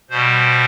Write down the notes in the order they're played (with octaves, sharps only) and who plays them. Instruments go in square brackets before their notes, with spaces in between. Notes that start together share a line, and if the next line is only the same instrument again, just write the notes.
[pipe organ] B2 G3 C5